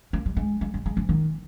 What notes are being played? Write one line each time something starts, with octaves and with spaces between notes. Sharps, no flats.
A#3
G3
G#3
G#3
G3
G#3
E3
D#3